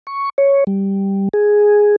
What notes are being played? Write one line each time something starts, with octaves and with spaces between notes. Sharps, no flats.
C#6
C#5
G3
G#4